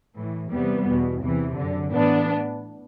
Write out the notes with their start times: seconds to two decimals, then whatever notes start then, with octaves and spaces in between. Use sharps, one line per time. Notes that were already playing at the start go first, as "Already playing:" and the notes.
0.16 A2 E3
0.51 E2 C3 E3 G3 B3
0.87 E2 B2
1.21 E2 C3 E3
1.56 F#2 D3
1.92 A2 E3 B3 D4